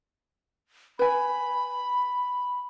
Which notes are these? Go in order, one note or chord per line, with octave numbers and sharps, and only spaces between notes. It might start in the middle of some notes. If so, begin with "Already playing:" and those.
B4 G#5 B5